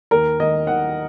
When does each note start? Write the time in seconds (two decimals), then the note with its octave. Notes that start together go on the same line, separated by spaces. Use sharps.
0.11 D#2 A#4
0.39 D#2 D#5
0.66 D#3 F#5